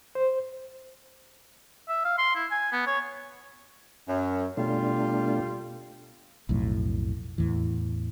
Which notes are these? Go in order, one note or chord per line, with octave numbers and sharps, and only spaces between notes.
C5
E5
F5
C6
E4
G#5
B3
C#5
F#2
B2 G3 A3 D4 F4
B1 F2 A2
E2 A2 E3